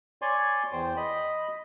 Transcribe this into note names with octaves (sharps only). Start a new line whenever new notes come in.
C#5 D5 G#5 C6
E2 C5 G5
D#5 B5